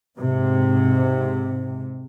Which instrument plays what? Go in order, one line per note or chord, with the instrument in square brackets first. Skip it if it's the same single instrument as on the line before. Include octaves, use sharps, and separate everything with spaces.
[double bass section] G#2 C3